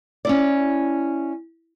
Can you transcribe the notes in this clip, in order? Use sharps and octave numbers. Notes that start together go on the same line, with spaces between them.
C#4 E4 D5